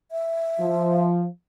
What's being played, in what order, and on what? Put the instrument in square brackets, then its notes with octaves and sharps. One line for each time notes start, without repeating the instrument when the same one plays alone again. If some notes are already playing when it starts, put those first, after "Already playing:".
[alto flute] E5
[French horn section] F3